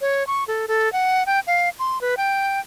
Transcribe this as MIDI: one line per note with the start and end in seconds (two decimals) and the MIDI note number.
0.01 0.26 73
0.27 0.44 85
0.48 0.66 69
0.68 0.91 69
0.93 1.24 78
1.26 1.40 79
1.47 1.69 77
1.79 2.01 84
2.01 2.15 71
2.17 2.60 79